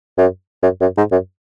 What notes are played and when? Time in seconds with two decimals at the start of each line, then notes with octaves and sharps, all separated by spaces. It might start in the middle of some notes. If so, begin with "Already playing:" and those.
0.18 F#2
0.63 F#2
0.81 F#2
0.98 G#2
1.12 F#2